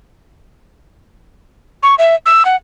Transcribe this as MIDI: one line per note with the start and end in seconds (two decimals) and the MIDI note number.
1.83 1.95 85
1.98 2.15 76
2.26 2.43 88
2.45 2.56 78